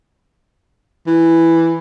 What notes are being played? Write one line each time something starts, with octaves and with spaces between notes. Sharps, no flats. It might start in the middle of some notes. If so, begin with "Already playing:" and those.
E3